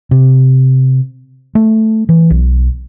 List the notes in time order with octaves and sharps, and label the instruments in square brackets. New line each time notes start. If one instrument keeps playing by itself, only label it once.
[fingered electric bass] C3
A3
E3
B1